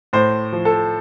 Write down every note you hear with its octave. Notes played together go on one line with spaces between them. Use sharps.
A2 C5
F3
A4